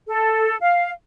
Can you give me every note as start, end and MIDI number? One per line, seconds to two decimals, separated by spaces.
0.07 0.56 69
0.61 0.90 77